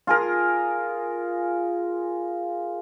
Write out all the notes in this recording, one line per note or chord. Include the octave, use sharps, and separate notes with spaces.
F4 G#4 A#4